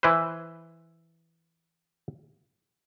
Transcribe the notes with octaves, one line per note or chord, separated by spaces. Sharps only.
E3 E4 B4 C5